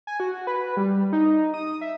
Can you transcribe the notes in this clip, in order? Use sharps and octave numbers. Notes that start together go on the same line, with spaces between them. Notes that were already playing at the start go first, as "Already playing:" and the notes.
G#5
F#4
B4
G3
D#4
D#6
E5